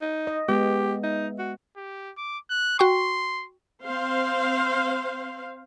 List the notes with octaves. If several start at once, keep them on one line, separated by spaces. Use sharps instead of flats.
D#4
D#5
G#3 B3 G4
D#4 E5
F#4
G4
D6
F#6
F#4 G5 C6 C#6
C4 C5 F5